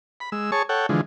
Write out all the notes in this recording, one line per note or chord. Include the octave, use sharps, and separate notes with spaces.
B5
G#3 E6
G#4 C#5 A5 C#6
A4 C#5 F#5 G5
D3 E3 F3 G#3